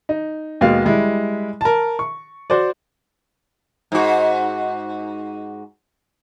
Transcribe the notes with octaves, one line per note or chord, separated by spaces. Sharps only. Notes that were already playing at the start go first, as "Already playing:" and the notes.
D#4
D#2 B2 G#3 F5
G3 G#3 E4
A#4 A5
C#6
F#4 C5 D5
G#2 F#4